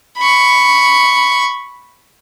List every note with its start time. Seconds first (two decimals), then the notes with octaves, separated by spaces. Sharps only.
0.18 B5 C#6